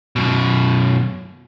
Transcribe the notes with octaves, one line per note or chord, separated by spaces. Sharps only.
F#2 B2